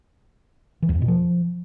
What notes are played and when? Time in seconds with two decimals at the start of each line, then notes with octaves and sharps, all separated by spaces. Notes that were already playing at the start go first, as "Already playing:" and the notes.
0.82 E3
0.89 E2
0.95 F2
1.02 B2
1.08 F3